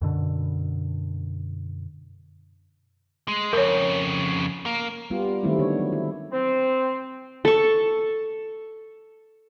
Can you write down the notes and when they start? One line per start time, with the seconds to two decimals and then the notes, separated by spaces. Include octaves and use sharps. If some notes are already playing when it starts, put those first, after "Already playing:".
0.01 F#2 B2 D3
3.28 G#3
3.53 F2 C#3 A#4 C#5
4.66 A#3
5.10 G3 B3 F4 G4
5.43 D#3 F#3 G3 A3 C4 E4
5.58 D3 B3 C#5
5.79 F#3
5.92 E4
6.32 C4
7.45 A4 C#6